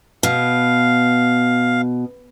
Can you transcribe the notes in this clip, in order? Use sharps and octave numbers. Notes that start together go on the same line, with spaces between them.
B2 F5